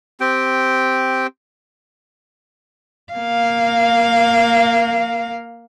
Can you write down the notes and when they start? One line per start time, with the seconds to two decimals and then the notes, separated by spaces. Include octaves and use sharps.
0.20 C4 G4 G5
3.13 A#3 F5